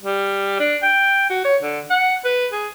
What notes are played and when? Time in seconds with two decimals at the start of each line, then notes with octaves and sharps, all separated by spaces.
0.03 G3
0.59 D4
0.83 G5
1.30 F#4
1.45 C#5
1.62 D3
1.90 F#5
2.25 B4
2.53 G#4